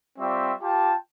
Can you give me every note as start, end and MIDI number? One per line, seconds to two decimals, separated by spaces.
0.19 0.54 55
0.19 0.54 60
0.19 0.54 65
0.19 0.54 74
0.19 0.54 76
0.19 0.54 85
0.62 0.94 65
0.62 0.94 67
0.62 0.94 79
0.62 0.94 81